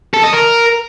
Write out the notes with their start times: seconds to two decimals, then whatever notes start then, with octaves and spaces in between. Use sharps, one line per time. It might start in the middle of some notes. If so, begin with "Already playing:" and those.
0.14 A4
0.23 D#5
0.33 A#4